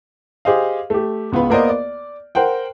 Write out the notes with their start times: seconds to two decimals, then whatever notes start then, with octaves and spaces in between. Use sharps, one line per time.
0.45 G4 G#4 C5 D#5 F5
0.90 A3 G4
1.32 C#2 B3 F4 B4
1.50 A#3 B3 A#4 C5 D5 D#5
1.69 D5
2.35 A#4 C5 F#5 G5